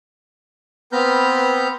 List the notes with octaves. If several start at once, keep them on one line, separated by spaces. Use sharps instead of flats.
B3 C4 B4 A#5 F6 G6